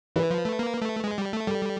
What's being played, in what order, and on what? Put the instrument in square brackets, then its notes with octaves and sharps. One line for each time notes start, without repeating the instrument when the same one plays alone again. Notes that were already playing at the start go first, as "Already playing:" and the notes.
[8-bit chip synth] E3 [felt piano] B4
[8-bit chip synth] F3
A3
A#3
A3
G#3
G3
A3
[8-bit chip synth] G3 [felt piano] A4